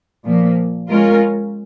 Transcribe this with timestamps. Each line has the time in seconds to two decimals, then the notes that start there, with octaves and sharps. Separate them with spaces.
0.24 A#2 F3 A#3
0.89 G#3 C#4 F4 A#4